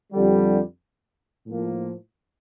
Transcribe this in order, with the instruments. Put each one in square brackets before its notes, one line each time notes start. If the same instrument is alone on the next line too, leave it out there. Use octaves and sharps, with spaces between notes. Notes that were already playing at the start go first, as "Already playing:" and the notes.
[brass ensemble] F2 D3 G3
A2 F3 A#3